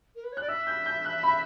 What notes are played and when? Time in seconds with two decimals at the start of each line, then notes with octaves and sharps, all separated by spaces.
0.15 A#4
0.23 B4
0.32 C#5
0.37 D5 F#6
0.48 E5 E6
0.67 G6
0.86 G6
1.05 F#6
1.23 B5